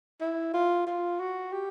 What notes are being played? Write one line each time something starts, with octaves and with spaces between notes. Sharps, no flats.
E4
F4
F4
F#4
G4